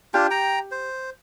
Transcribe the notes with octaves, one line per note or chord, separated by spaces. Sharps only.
D4 F4 G4
G5 A#5
C5